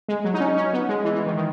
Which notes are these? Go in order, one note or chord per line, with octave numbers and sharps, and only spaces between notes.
G#3
F#3
D#4
C#4
C#4
B3
G#3
E3
E3
D#3
D#3